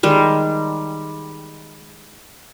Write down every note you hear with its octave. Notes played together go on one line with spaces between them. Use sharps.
D#3 G3 G#3